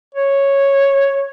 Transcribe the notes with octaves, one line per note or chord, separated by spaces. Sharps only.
C#5